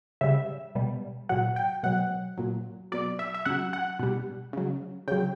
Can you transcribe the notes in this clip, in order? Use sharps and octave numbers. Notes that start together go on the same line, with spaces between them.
C#3 G3 E5
B2 G3
A#2 F#3 F#5
G5
B2 F#3 F#5
A#2 F#3
B2 F#3 D5
E5
E5
C#3 F#3 F#5
F#5
B2 G3
C#3 F#3
C#3 F#3 G5